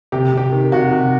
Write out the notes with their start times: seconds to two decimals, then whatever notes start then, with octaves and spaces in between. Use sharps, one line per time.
0.12 C3 G4
0.32 C3
0.37 G4
0.52 D#3
0.72 C3 F#4
0.92 C3